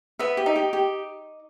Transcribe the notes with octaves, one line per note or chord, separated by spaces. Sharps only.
B3 E5
G4
D#4
G4
G4